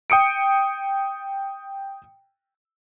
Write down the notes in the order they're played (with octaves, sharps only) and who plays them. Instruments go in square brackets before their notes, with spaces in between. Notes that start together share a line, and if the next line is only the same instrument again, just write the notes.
[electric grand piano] G5 D#6 C#7 D7